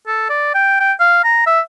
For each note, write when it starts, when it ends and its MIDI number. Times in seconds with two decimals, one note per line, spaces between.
0.07 0.29 69
0.30 0.52 74
0.55 0.78 79
0.80 0.93 79
1.00 1.23 77
1.24 1.43 82
1.47 1.60 76